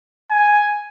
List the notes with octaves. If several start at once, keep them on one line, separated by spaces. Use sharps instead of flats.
G#5